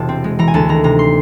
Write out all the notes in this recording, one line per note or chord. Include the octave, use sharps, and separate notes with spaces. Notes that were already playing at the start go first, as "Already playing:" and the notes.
Already playing: E1 C3 A5
C4
G#3
E3 A#5
G#5
D2 A5
D#3 A#5
C3 A#5
C6